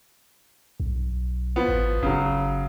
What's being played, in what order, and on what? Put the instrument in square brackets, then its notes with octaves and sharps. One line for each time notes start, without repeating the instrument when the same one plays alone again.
[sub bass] B1
[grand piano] F3 B3
[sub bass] G#1
[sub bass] F#1 [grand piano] C#3 F#3